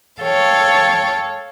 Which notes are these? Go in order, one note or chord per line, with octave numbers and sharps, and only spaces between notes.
A4 C#5 F5 G5